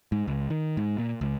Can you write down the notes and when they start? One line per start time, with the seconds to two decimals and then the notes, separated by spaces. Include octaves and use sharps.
0.12 G#2
0.28 C#2
0.50 D#3
0.77 G#2
0.98 A#2
1.21 C#2